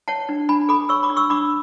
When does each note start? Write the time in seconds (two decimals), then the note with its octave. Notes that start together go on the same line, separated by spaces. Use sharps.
0.08 C#5 F#5 A5
0.29 D4
0.49 D4 G#5 B5
0.69 A4 B5 D6
0.89 C#5 C#6 E6
1.03 B5 D6
1.10 D4
1.17 C#6 E6
1.30 D4 B5 D6